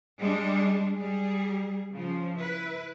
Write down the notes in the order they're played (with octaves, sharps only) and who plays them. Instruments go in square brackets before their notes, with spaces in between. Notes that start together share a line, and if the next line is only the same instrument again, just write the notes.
[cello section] G3 G#3 D4
G3 G#4
C#3 F3
E4 B4